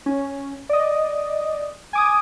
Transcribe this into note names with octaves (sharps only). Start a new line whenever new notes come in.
C#4
D5 D#5
G#5 D6 D#6